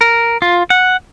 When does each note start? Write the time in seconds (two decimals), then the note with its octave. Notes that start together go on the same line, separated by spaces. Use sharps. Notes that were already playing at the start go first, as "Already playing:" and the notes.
0.01 A#4
0.42 F4
0.70 F#5